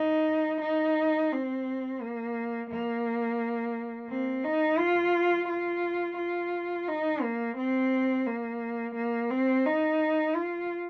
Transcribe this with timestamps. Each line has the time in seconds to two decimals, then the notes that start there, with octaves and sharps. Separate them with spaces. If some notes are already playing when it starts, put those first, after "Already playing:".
Already playing: D#4
0.61 D#4
1.32 C4
2.02 A#3
2.71 A#3
4.10 C4
4.45 D#4
4.79 F4
5.49 F4
6.18 F4
6.88 D#4
7.22 A#3
7.58 C4
8.27 A#3
8.96 A#3
9.30 C4
9.66 D#4
10.36 F4